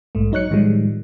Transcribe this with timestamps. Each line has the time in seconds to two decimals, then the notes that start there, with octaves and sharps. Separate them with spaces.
0.15 A#1 G#2 A3
0.32 F#3 D#4 C#5 F#6 C#7
0.51 A2 D#3 F3 G3 G#3